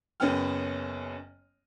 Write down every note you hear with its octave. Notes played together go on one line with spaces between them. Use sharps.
F#1 F#2 B3 C#4 G5 F6